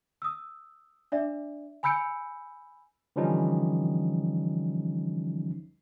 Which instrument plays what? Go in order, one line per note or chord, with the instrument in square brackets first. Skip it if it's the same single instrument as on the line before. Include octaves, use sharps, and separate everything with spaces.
[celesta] D#6 E6
D4 D5 E5
G#5 B5 E6 G6 C#7 D7
[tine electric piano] D3 E3 F3 G3 C#4 D#4